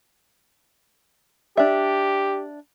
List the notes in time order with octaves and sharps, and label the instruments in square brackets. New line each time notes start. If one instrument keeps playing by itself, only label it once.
[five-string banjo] D4 E5 [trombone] G4